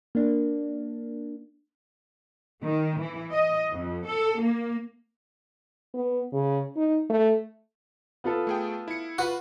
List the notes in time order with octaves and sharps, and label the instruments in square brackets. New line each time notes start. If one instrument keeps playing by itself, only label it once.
[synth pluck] A#3 D4
[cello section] D#3
E3
D#5
F2
A4
A#3
[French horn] B3
C#3
D#4
A3
[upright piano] B3 F4 A4
[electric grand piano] A3 G#4 G5
E4 C#7
[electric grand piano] F4 B4 B5 [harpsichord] F#4